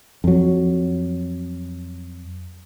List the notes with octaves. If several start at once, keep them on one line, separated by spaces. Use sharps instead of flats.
F2 F#3